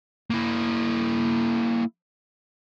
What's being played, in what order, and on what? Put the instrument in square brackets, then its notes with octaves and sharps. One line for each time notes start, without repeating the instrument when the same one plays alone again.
[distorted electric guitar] A#3 E4